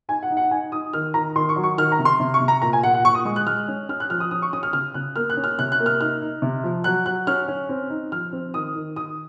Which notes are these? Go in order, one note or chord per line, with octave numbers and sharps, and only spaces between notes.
D#4 G#5
F#5
D#4
F#5
D#4 G#5
D#4 D#6
D#3 F6
D#3 A#5
D#3 C6
C#6
F#3
C#6
D#3 F6
A#5
C3
C6
C3
C#6
C3
A#5
A#2 A#5
G#5
A#2 F#5
F#5
A#2 C#6
D#6
G#3 D#6
F#6
G#3 F6
C#4
C#4 F6
F#6
F3 F6
D#6
C#4 D#6
C#6
C#4 D#6
F6
C#3 F6
C#3 F#6
A#3 F6
F#6
C#4
F6
C3 F#6
F#6
A#3
F6
D#4 F6
D#4
C3
F3
F#3 F#6
F#3 F#6
C#4 F6
C#4
C4
D#4
F3 F6
C4
D#3 D#6
D#3
D#3 D#6